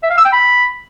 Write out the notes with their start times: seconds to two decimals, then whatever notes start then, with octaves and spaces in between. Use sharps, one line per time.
0.03 E5
0.11 F5
0.18 E6
0.25 G5
0.33 B5